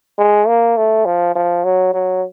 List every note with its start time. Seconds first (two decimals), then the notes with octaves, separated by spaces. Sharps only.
0.18 G#3
0.47 A#3
0.77 A3
1.05 F3
1.35 F3
1.64 F#3
1.94 F#3